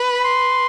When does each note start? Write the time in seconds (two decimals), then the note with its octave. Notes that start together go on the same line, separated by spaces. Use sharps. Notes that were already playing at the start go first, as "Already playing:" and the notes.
Already playing: B4
0.14 B5
0.24 C6